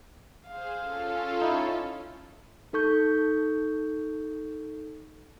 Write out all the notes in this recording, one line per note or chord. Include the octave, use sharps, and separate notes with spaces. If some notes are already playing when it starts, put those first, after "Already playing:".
G#4 C5 F5
C#4 F4 A4
D#4 E4
D#4 A4 C#6 G6